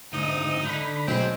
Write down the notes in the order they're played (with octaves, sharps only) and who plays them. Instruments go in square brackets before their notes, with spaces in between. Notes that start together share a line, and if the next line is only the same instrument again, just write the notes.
[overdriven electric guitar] D2 G#2 [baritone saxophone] D#4 [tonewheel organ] D#6
[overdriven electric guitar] D3 [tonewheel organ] B5
[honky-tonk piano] B1 [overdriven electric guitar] G#3 [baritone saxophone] C4